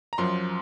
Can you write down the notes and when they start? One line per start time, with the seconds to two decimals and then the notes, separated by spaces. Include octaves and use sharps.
0.13 A#5
0.18 F#2 F3 C6